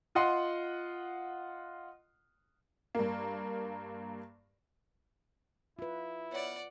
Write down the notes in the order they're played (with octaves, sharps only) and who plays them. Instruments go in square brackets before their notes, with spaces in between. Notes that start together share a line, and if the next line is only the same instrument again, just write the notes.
[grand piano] F4 D#5 F#5 C6
[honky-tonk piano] G2 A#3
[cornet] E4 [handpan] F4 B4
[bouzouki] B3 C#4 [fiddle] D5 F#5